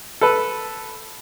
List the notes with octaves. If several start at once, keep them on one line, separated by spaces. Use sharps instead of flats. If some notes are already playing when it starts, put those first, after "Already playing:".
A4 B4